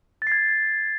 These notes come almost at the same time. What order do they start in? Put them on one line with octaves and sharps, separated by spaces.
A6 C7 G#6